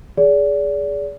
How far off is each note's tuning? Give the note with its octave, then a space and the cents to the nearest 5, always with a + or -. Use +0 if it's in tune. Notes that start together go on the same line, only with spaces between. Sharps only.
G#4 +0 D5 -30